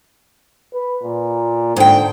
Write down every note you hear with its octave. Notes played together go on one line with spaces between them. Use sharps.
B4
A#2
G#2 D3 G5